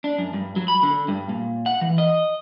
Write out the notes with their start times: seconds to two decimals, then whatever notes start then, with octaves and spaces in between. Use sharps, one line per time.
0.04 D4
0.18 F#2
0.34 G2
0.56 F#3
0.68 B5
0.83 D3
1.08 G2
1.29 A#2
1.66 F#5
1.81 E3
1.98 D#5